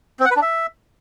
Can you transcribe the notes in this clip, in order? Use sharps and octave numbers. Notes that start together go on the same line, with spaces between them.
C4
F#5
B4
D4
E5